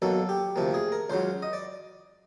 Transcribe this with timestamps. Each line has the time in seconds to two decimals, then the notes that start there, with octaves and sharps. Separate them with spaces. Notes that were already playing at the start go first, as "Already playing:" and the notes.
0.02 B1 B2 F#3 A#3 A4
0.29 G4
0.56 D2 C3 F3 A#3
0.74 G#4
0.92 A#4
1.10 C#2 C#3 F#3 C5
1.42 D#5
1.53 D5